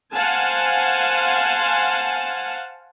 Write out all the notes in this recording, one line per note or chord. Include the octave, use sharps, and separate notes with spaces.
C5 F5 F#5 G#5 A5